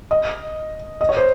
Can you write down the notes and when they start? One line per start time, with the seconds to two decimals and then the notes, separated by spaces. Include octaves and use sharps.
0.11 D#5
1.01 D#5
1.09 C#5
1.17 C5